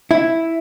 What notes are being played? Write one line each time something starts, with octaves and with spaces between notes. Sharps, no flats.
E4